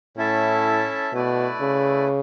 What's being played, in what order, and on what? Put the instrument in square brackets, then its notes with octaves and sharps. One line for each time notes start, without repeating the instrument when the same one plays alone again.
[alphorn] A2 [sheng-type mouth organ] C#4 E4 A4 E5 A5
[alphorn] B2 [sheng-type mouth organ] A3 E4 B4 D5
[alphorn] C#3